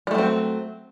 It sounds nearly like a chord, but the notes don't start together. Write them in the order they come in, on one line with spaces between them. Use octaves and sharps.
G3 A3 F#3 C4